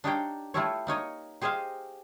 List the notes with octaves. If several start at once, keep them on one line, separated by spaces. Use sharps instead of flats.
D4 D#4 G4 C#5 F5 G5
A3 E4 F4 G4 A4 C#5
A#3 D#4 C#5 D#5
G4 G#4 C5 D#5 F5